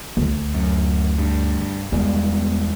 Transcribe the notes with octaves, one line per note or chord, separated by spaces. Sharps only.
D2
F#2
G2
E2 G3 G#3 B3